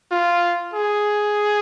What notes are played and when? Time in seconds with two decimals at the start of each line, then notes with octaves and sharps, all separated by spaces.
0.11 F4
0.74 G#4